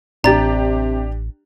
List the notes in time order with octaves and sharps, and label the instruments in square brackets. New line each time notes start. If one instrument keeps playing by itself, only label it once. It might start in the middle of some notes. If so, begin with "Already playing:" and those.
[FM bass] A1 [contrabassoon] C3 [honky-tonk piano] D4 G4 [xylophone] A#5 A6